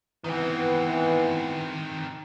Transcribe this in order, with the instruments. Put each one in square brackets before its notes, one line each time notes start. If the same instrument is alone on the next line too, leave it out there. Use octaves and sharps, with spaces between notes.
[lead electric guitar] D#3 C4 [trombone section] E3 B3